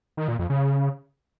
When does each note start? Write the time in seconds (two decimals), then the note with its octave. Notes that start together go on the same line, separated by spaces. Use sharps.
0.17 D#3
0.28 A#2
0.39 F2
0.50 C#3